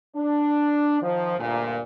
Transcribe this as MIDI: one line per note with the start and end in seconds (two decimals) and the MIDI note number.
0.15 0.97 62
1.01 1.34 51
1.01 1.34 53
1.38 1.80 38
1.38 1.80 43
1.38 1.80 46